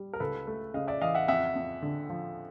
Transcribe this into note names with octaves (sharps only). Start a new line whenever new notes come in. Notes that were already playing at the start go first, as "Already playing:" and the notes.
Already playing: G3
A#4
C#2 A4 B4
A3
C#3 D#5 F5
D5 E5
E3 D#5 F5
E5 F#5
F2 E5 F#5
F2
D3
F3